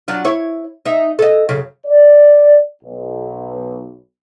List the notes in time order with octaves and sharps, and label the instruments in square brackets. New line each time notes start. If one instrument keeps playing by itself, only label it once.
[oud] F#3 D4 F4
E4 C#5
D#4 E5
A4 D#5
F#2 C#3
[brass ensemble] D5
B1